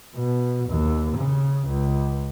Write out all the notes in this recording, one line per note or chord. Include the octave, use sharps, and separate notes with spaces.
B2
D#2
C#3
C#2